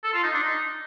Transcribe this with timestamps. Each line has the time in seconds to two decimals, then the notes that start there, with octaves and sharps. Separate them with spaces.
0.04 A4
0.13 F4
0.23 D#4
0.33 D4
0.43 D#4